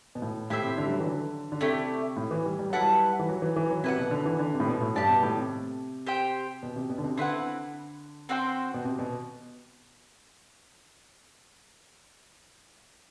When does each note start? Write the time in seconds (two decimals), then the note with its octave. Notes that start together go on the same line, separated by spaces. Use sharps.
0.15 B2
0.22 A2
0.50 A2 E4 G4 C5 E5
0.64 C3
0.78 D3
0.86 G3
0.92 F#3
1.00 E3
1.06 D3
1.52 D3
1.61 C3 A3 E4 G4 D5
2.17 A2
2.31 E3
2.45 G3
2.59 G3
2.70 F#3 E4 B4 F#5 A5
2.81 G3
3.19 E3
3.29 F#3
3.42 E3
3.56 E3
3.70 F#3
3.84 C3 E4 B4 F#5
3.98 B2
4.11 D3
4.26 E3
4.39 D3
4.54 C3
4.60 A2
4.68 B2
4.81 A2
4.95 G2 G4 D5 A5
5.09 B2
5.23 A2
5.37 C3
6.07 G4 C5 G5
6.63 B2
6.76 C3
6.90 B2
6.98 D3
7.04 C3
7.18 D3 C4 E4 B4 F#5
8.29 C4 F#4 C5 G5
8.74 B2
8.85 C3
8.99 B2